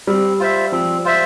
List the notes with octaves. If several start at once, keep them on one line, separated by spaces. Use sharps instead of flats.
G3 C4
F4 C5 E5
F3 C4
F4 C5 E5